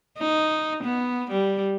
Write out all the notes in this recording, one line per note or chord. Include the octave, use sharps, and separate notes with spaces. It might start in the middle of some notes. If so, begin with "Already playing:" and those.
D#4
B3
G3